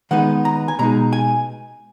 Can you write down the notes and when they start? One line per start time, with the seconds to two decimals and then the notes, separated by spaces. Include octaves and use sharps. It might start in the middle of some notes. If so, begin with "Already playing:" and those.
0.11 D#3 G#3 B3 D#4 F#5
0.45 A#5
0.68 G#5
0.79 B2 G#3 D#4 A#5
1.13 G#5